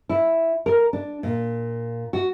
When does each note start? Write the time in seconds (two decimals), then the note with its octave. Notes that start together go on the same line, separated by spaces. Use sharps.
0.09 E4
0.66 A#4
0.93 D4
1.23 A#2
2.13 F#4